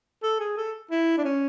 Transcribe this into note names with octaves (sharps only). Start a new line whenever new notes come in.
A4
G#4
A4
E4
D4
C#4